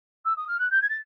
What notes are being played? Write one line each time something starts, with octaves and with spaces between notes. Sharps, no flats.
E6
D#6
F6
F#6
G6
G#6
A6